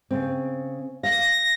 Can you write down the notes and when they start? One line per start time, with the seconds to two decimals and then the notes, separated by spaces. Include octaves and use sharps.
0.11 C#3 C4
1.03 F5 A#6